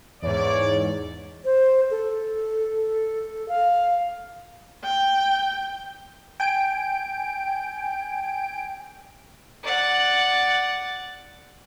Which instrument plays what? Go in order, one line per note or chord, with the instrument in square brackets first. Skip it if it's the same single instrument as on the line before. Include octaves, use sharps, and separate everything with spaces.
[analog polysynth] E2 G#2 [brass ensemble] C#5 D5
[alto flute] C5
A4
F5
[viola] G5
[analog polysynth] G5 G#5 D7
[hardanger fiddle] D5 F#5